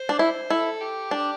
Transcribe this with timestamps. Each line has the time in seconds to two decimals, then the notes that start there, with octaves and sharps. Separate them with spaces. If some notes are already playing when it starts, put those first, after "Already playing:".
Already playing: C5
0.09 D4
0.19 E4
0.50 E4 A4
0.81 G4
1.11 D4